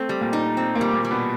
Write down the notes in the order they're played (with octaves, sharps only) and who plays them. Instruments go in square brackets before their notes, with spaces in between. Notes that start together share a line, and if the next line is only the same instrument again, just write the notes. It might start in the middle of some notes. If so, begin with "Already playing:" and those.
Already playing: [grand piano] A3 [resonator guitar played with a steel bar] C4
[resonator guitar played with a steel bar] G3
[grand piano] A#2 A#3
[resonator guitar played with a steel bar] D#4
C4
[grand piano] A#2 A#3
[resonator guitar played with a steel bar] G3
[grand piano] A#2 A#3
[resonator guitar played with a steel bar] G3
[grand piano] B2 B3